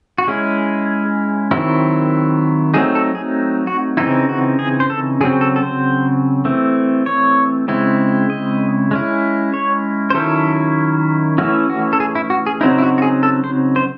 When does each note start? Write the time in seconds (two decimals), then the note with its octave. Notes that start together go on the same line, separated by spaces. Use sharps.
0.18 F#4
0.27 G#3 C#4 E4 G#4
1.51 D#3 F#3 C4 E4
2.74 F#3 A3 C4 D#4 G#4
2.95 A4
3.15 G#4
3.67 F#4
3.97 C#3 E3 C4 D#4 E4
4.29 F#4
4.59 G#4
4.80 C5
4.90 A4
5.21 C#3 F#3 C4 G#4
5.41 A4
5.56 A4
5.63 C5
6.45 E3 A3 C4
7.06 C#5
7.68 C#3 G#3 C4 E4
8.30 D#5
8.91 G#3 C#4 E4
9.54 C#5
10.10 C5
10.14 D#3 F#3 C#4 E4 A4
11.38 E3 A3 C#4 E4 F#4
11.70 F#4
11.93 A4
12.00 G#4
12.15 E4
12.30 F#4
12.46 G#4
12.61 C#3 F#3 C4 D#4 E4
12.78 E4
12.83 F#4
12.98 F#4
13.02 G#4
13.23 A4
13.44 C5
13.76 C5